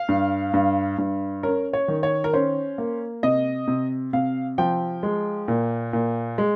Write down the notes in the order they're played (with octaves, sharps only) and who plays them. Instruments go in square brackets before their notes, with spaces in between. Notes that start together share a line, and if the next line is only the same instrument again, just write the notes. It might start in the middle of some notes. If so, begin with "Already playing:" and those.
Already playing: [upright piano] F5
G2
G2
G2
C#4 A#4
C#5
D#3
C#5
A#4
C#4 C5
A#3
C3 D#5
C3
C3 F5
F3 G5
G#3
A#2
A#2
G#3